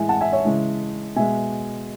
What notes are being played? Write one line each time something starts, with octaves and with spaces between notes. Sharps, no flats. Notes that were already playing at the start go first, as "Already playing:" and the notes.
Already playing: A2 E3 G#3 E5 G#5
F#5 A5
E5 G#5
C#5 E5
C#3 E3 G#3
B2 G#3 E5 G#5